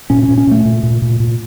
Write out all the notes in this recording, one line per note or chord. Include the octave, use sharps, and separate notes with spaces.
A#2 C#4
C#4
A#2
C#4
A#2 A3
A#2
A#2
A#2
A#2